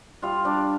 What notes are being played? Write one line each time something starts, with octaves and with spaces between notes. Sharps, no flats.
G3 F4 F5
G3 D4 D5